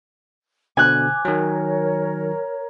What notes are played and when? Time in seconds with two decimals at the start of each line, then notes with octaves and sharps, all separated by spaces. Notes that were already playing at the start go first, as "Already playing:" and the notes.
0.77 B2 D3 G#5 D6 F#6
1.25 D#3 F#3 A#4 C#5 A#5